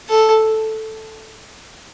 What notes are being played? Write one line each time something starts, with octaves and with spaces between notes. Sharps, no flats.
A4